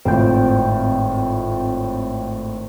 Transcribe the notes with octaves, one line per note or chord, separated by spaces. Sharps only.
G#1 A2 C4 F4 G5